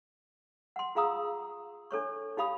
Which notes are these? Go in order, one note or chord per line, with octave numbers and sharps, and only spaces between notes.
F#5 C6
F4 G#4 F5 A#5 D#6 E6
D4 A4 C#5 C#6
D#4 G4 F5 B5 D#6